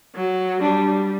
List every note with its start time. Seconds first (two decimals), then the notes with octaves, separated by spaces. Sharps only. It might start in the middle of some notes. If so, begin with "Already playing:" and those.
0.15 F#3
0.61 G3 D4